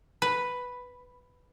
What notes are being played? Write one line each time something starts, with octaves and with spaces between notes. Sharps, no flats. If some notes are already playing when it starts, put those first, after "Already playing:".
B4